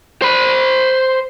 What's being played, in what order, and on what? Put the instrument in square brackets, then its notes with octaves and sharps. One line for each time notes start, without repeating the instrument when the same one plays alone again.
[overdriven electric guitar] C5 B5